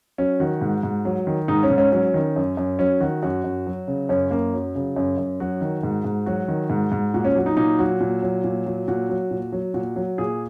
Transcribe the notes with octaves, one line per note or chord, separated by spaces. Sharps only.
F#3 C#4
D#3 F#4
G#2
G#2
F#3
D#3
G#2 D#4
C#4
G#2
C#4
F#3 C#4
D#3
F#2
F#2
F#3 C#4
D#3 F#4
F#2 F#4
F#2
F#3
C#3
F#2 C#4
F#2 A#3
F#3
C#3
F#2
F#2
F#3 F#4
D#3
G#2
G#2
F#3 F#4
D#3
G#2
G#2
A#2 F#4
C#4
F#3 F#4
D#4
A#2 D#4
F#3 F#4
A#2
F#3
A#2
F#3
A#2 F#4
F#3
A#2
F#3
A#2 F#4
F#3
A#2 G#4